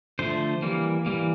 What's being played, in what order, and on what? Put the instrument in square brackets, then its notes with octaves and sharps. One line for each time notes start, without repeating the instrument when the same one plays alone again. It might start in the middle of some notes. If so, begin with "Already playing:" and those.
[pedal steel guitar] D3 F3 A3 C5
E3 G3 A#3
E3 G3 A#3